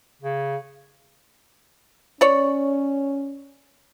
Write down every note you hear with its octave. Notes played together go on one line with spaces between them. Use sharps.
C#3
C#4 C#5 D5